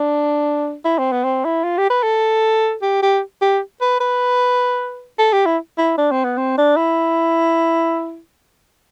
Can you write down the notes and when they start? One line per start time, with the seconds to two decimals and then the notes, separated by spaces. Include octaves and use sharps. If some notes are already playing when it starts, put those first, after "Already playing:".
Already playing: D4
0.85 E4
0.98 C4
1.12 B3
1.24 C4
1.45 E4
1.64 F4
1.78 G4
1.90 B4
2.03 A4
2.82 G4
3.03 G4
3.42 G4
3.81 B4
4.00 B4
5.19 A4
5.33 G4
5.46 E4
5.78 E4
5.98 D4
6.11 C4
6.25 B3
6.38 C4
6.58 D4
6.77 E4